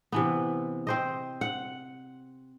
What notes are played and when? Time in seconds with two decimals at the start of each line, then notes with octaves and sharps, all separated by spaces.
0.12 C3 E3 B3
0.87 C4 C5 D#5
1.41 F#5